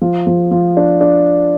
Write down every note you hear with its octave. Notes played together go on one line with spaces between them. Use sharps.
F3
F3
F3
D4
D4